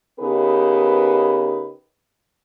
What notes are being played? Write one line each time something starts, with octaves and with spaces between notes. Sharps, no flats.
C#3 B3 D#4 G4 A#4 B4